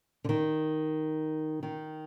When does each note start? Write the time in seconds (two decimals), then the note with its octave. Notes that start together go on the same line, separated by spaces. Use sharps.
0.24 D3
0.29 D#3
1.63 D#3